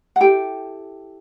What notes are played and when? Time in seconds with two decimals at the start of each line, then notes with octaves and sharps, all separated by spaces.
0.16 F#5
0.20 E4 G4 A4 G5